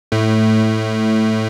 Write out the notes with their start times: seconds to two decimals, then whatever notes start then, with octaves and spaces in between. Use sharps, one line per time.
0.12 A2 A3